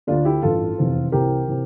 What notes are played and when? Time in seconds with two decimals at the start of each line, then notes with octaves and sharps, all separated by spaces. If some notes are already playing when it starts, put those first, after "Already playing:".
0.07 D2 D3 D4 F4
0.25 E4 G4
0.42 A1 G2 E3 F4 A4
0.78 F1 E2 C3 E3
1.12 C2 C3 E3 G4 A#4
1.48 C3 E3